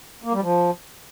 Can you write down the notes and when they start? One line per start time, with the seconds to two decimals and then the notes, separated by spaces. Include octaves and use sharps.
0.24 A#3
0.33 G3
0.42 F3